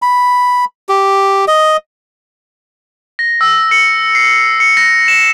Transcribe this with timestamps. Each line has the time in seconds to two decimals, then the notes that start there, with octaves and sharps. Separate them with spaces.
0.02 B5
0.89 G4
1.48 D#5
3.19 A#6
3.41 E6
3.71 C#7
4.15 C7
4.60 C#7
4.77 A#6
5.08 E7